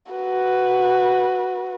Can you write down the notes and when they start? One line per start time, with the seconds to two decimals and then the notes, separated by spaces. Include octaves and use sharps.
0.12 F#4 B4